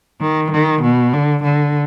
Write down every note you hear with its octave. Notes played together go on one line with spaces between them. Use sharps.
D#3
D#3
B2
D3
D3